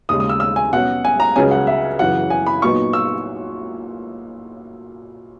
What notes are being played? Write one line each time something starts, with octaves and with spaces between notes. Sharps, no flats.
D#2 C#3 G#3 D#6
D#6
E6
E6
G#5
B2 F#3 C#4 F#5
G#5
A#5
C#2 C#3 F#3 C#4 G#5
F#5
E5
F#2 C#3 E3 F#5
G#5
B5
A#2 F#3 B3 D#4 C#6
E6